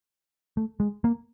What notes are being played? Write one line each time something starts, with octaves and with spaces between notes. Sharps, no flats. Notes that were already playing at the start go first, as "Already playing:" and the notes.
A3
G#3
A#3